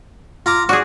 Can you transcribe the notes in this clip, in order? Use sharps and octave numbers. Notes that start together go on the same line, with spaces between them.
F4 A#5 D6
F#4 G#4 D5